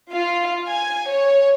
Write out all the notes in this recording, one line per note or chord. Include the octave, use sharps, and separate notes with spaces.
F4
G#5
C#5